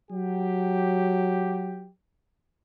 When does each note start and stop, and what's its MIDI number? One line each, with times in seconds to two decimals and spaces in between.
0.12 1.89 54
0.12 1.89 67